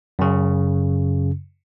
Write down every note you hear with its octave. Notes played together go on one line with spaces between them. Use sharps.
F#2 C#3